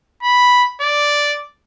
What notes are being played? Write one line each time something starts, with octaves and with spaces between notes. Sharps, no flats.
B5
D5